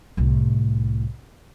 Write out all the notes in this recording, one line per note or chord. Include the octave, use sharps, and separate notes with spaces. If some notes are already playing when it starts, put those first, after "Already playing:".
C2 A2